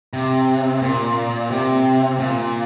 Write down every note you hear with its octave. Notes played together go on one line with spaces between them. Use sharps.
C3
A#2
C3
A#2